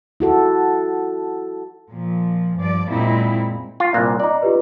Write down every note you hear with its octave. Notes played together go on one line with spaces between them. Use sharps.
E4 F#4 A4
A#2 F3
G2 F3 D5
F#2 A#2 G#3 C4 D#4 E4
F4
C2 A#2 D6 F#6 A#6
D#4 D5
F4 G4 B4